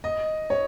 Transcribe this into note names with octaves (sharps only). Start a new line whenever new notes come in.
D#5
C#5